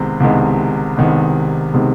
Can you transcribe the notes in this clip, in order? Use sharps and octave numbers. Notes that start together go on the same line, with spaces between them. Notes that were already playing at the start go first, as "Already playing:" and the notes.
Already playing: C2 C3 D#3 G#3 B3
C2 C3 D#3 G#3 B3
C2 C3 D#3 G#3 B3
C3 D#3 G#3 B3